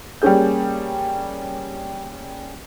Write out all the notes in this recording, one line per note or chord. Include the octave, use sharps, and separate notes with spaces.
G3 A#3 C#4 G#4 G6